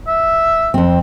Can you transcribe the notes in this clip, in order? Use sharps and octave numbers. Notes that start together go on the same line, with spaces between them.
E5
F2 C4